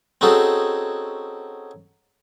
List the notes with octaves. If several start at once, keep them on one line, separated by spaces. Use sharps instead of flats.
C4 C#4 D#4 F#4 G#4 A4